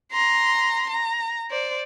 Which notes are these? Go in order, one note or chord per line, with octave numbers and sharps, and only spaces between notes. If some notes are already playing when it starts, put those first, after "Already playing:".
A#5 C6
A#5
C5 D5